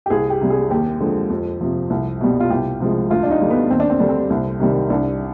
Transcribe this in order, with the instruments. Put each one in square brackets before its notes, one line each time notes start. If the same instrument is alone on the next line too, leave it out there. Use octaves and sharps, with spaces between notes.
[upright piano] G4
C2 G#4
G4
C3 G3
G#4
D#2 G4
D3 F3 G#3
F2
C3 F3
C2
B2 G3
F4
C2 G4
C3 F3 G#3
D2 F4
D4
D#4
D3 G3
B3
D#2 C4
D4
C4
D3 G3 D4
C4
C2 C4
C3 D#3 G3
C2 D4